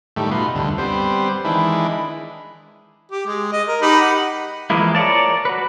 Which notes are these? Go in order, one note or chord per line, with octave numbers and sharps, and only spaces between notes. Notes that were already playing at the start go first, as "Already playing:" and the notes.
A2 D#3 G3 A3
B2 D#4 F4 B4 C6
D2 G2 D3
G3 B3 C4 C5
D#3 E3 G#3 D4 E4
G4
G#3
D#5
A#4
D#4 G4 B5
F#5
E3 F3 G#3 A#3 E4
A#4 C#5 D5 A5
F#4 B4